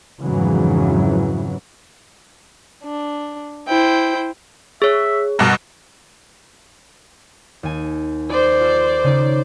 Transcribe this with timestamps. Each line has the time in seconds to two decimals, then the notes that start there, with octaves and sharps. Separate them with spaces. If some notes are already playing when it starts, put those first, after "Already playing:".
0.21 F2 G#2 C#3 E3 F#3
2.84 D4
3.68 E4 C5 G5
4.82 G#4 C#5 E5
5.39 G2 B2 A#4
7.63 D#2 G#5
8.30 G#4 C5 D5
8.60 F4 A4
9.04 C#3 C#4 D#4